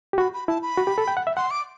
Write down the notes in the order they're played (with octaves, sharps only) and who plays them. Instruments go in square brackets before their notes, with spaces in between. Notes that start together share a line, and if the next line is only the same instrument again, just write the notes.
[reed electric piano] G4
[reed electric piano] F#4 [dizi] B5
[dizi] B5
[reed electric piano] E4 [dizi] A5
[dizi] B5
[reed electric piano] F#4
G4
A4
G5
F#5
E5
[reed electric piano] F#5 [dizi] C6
[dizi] D6